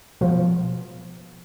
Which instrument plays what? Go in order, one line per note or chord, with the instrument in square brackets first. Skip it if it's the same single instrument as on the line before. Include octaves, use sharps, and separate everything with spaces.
[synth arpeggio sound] B2 F3